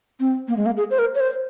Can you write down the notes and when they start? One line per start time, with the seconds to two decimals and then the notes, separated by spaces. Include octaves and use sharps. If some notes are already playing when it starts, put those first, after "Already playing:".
0.20 C4
0.48 A#3
0.57 G#3
0.66 A#3
0.77 G#4
0.91 C5
0.99 A#4
1.15 C#5
1.20 C5